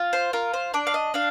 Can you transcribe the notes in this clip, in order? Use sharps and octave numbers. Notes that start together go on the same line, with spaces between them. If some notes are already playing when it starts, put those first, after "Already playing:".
Already playing: F4
C5
F4 A#4
C5
D4 D5
F5
D#5
D4 F5